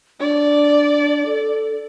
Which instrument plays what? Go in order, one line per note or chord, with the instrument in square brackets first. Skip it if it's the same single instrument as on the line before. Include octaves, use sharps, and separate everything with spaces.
[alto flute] D4 [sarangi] D5
[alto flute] A4